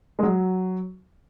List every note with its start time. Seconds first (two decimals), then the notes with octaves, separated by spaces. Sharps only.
0.19 G#3
0.23 F#3